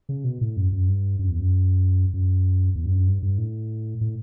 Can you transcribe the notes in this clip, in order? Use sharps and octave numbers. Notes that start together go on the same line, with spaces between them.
C#3
B2
A2
F#2
F#2
G2
F#2
E2
F#2
F#2
E2
G2
F#2
G2
G2
A2
A2